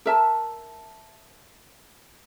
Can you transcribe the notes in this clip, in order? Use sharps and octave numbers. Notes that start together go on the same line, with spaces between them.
A#4 E5 A5